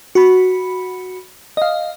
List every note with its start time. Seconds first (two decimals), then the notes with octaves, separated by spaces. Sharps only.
0.15 F#4 B5
1.57 D#5 F5